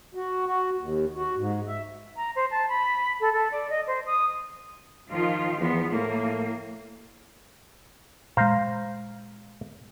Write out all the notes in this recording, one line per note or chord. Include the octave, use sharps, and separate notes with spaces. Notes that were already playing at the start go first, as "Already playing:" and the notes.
F#4
F#4
D#2
F#4
G#2
E5
A#5
C5
A5
B5
A4
A4
D5
D#5
C5
D#6
D#3 F3 F4
E2 F3 B3
A2 A#3
A#2 G#3 C5 F5 A#5